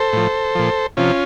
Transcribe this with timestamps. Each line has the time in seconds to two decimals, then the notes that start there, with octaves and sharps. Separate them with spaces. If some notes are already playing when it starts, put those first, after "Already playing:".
Already playing: A4 C5
0.13 A2 F3
0.55 A#2 F3
0.97 C3 F3 C#4 F4